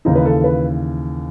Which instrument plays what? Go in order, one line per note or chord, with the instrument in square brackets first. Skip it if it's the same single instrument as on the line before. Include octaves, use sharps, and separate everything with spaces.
[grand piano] D#2 C#3 E3 D#4
B4
A4
B4